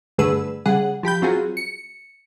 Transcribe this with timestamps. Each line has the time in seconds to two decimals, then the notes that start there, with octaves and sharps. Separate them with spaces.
0.18 G2 D3 A3 G#4 B4 E6
0.66 C#3 G3 G#4 F#5
1.03 F3 G4 B5 G6
1.22 F#3 C4 F4 F#4 G#4
1.57 C#7